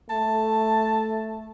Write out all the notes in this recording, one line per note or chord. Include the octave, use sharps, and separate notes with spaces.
A3 A5